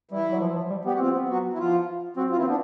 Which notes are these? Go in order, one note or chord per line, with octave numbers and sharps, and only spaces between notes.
E3 G3 E4
F#3
F3
F3
G3
B3 G4
F#4
F3 C4 F4
B3
F#3 F#4
E4
F3 F4
F#3 C4 F#4
F4
E3 E4
C4
B3 D4